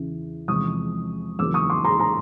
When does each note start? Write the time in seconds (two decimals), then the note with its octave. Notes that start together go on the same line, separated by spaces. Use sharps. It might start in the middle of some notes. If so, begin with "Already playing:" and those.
Already playing: E2 C#3 E3
0.48 E2 C3 F3 G#3 C#6 D#6
1.39 E2 C#3 F#3 A#3 C#4 D6 E6
1.54 C#6 D#6
1.70 C6 D6
1.84 A#5 C6
1.99 A#5 C6